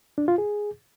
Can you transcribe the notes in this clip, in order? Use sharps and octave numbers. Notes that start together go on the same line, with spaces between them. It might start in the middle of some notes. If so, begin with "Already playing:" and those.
D4
F4
G#4